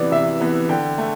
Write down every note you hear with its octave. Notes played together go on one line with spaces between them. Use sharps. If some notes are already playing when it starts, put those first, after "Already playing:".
Already playing: C3 E3 B3 D5
C3 E5
E3 B3
D3 G5
A3